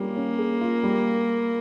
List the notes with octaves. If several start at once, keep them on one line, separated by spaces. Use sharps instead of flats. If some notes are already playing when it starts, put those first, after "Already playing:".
Already playing: G3 A#3 C#4 F4
C#4
G#4
F4
G3